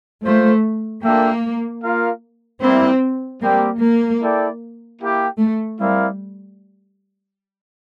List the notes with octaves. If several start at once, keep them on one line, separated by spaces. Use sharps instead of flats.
A3 A#3 F4 C5
A#3 D4 F4 A4 E5 G5
A#3 F4 A#4 F5
G3 A#3 C4 E4
G3 A#3 C4 G4 D5 G5
A#3
E4 A4 D5 G5
A#3 E4 G4
A3
G3 C4 E4 A#4 D5 F5